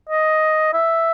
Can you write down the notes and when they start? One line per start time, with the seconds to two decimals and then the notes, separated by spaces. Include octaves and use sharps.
0.09 D#5
0.74 E5